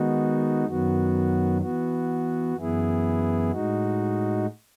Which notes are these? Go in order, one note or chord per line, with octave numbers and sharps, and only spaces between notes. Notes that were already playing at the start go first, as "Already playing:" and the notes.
Already playing: D#3 G#3 B3 D#4 F#4
F#2 D#3 F#3 B3 F#4
E3 B3 F#4
F#2 E3 B3 E4 G#4
A2 G#3 D#4 F#4